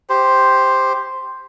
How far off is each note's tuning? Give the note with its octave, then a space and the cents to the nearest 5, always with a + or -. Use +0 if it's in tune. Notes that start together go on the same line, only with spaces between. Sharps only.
G4 +0 C5 +0